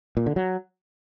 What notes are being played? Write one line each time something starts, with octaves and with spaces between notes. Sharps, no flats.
A#2
D3
F#3